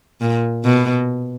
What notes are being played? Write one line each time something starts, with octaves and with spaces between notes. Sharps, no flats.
A#2
B2